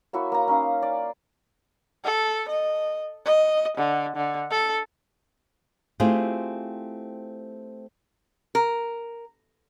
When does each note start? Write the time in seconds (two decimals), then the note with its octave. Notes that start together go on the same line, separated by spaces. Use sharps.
0.13 A#3 E4 F#4 C#5
0.32 A#3 A#5
0.48 C#4 D#4 F5
0.82 D5
2.05 A4
2.49 D#5
3.26 D#5
3.77 D3
4.16 D3
4.51 A4
6.00 A3 C4 E4 F4 G4 G#4
8.55 A#4